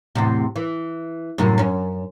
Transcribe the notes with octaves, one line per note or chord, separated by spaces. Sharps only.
E2 A2 C3
E3
F#2 A2 C3
F#2 C#4